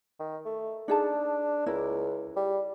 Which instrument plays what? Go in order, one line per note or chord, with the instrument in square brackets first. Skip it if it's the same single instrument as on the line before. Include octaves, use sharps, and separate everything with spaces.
[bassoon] D#3
A3
[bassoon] D4 [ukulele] D#4 G#4 A5
[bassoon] C#2 [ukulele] E4 A#4
[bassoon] G3